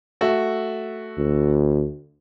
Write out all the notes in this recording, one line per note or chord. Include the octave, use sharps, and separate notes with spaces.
A3 F#4 E5
D2